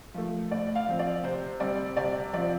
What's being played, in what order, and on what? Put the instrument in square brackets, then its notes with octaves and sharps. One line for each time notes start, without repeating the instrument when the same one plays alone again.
[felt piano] F3 A3
A2 D5
F5
F3 C4
D5
C3 C5
G3 C4 D5
C3 D5
F3 C4 D5